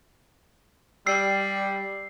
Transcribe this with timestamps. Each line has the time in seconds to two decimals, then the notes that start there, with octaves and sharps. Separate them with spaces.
1.06 G3 E6 C7